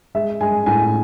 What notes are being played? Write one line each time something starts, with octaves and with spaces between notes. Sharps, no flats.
G#3 E5
G#3 G#5
A2 G#5